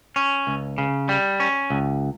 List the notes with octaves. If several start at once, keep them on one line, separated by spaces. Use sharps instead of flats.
C#4
C#2
C#3
G3
C#4
C#2